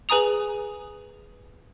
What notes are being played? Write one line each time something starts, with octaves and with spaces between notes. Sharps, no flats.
G#4 B4 G#5 A#5 D#6 F7